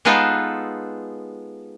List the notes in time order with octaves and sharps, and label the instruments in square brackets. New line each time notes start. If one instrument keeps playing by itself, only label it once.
[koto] G#3 B3 D#4 F4 A4 B4